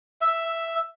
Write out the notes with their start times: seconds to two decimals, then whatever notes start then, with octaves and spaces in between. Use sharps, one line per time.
0.21 E5